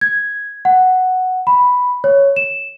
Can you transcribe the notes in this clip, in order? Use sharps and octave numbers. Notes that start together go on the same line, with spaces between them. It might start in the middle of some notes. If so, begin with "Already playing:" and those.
G#6
F#5
B5
C#5
E7